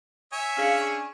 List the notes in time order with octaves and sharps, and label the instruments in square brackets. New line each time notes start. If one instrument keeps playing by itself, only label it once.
[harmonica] C#5 E5 [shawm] G#5
[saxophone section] C#4 D4 G#4 [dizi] F5
[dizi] C#6